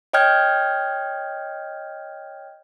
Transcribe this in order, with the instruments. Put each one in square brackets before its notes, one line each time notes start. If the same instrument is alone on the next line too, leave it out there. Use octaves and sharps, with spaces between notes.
[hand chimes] C#5 D#5 G5 F6 G6 G#6